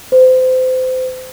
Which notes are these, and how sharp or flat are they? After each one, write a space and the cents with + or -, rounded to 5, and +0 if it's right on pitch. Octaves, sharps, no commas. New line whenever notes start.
C5 -30